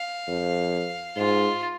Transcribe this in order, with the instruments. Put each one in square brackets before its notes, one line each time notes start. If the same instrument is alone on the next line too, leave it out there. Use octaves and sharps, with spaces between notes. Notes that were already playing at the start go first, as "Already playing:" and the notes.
Already playing: [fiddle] F5
[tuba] F2
[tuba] G#2 [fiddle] F4